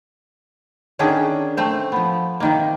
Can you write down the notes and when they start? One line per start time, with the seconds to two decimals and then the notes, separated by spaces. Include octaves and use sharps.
0.99 D3 D#3 C#4 D4 G#4
1.57 A3 C4 C5
1.92 F3 B3
2.40 C3 D#3 A#3